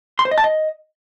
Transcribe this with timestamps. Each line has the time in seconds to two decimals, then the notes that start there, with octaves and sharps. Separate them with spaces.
0.19 C6
0.25 C5
0.31 D#5
0.38 A5
0.44 D#5